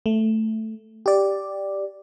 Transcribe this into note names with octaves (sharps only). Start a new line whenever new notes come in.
A3
G4 D5